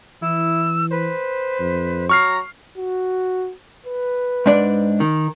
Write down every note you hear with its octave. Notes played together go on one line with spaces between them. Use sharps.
E3 E4 E6
B4 C5
F2
F#3 A#5 C#6 F6 C7
F#4
B4
G#2 D4 D5
D#3